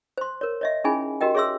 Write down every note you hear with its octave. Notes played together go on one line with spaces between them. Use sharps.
C5 C6
A#4 C#5
C#5 D#5 E5
C#4 D#4 E4 G#4 G#5 B5
F#4 G4 A#4 D#5 G5
G#4 C#5 E5 C6 E6